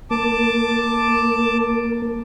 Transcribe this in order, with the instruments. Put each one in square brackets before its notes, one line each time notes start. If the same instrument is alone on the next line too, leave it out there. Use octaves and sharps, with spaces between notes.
[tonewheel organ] A#3 [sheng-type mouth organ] A5 D6